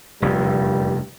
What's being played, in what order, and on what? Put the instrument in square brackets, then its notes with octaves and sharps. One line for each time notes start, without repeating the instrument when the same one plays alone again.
[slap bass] F1 E2 [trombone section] G2 A#2 G3